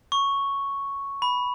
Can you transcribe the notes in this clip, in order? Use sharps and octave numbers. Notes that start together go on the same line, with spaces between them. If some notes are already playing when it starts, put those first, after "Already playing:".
C#6
B5